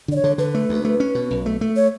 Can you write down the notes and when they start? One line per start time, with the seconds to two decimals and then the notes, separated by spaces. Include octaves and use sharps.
0.08 D3 D5
0.16 C#5
0.24 D3
0.38 D3 B4
0.55 A3
0.69 D2
0.85 A3
1.00 C#4
1.15 B2
1.31 B1
1.46 A3
1.61 A3
1.76 C#5